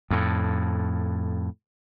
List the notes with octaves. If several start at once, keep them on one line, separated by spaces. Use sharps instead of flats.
F2 A2